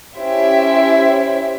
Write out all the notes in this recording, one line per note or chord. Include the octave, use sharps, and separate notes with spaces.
C#4 E4 G4 C5 E5